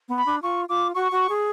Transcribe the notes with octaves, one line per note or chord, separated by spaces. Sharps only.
B3
B5
D4
F4 C#6
F4 D6
F#4 C#6
F#4
G#4